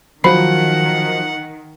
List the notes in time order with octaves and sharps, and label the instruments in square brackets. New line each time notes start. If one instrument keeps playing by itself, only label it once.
[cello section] D#3 [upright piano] F3 F#3 [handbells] C5 B5 C7 [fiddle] F#5